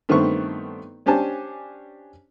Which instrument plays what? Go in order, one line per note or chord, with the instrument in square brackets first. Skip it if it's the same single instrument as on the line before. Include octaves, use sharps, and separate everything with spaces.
[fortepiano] G2 D#3 A3 B3 C4 C#6
C#4 D4 G4 C5 G#5 A5